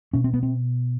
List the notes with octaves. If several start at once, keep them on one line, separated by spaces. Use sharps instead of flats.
B2 C#4
C4
B3
C4